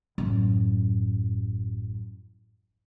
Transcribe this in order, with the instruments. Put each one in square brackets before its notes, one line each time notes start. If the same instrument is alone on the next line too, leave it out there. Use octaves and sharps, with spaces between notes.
[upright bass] A1 F#2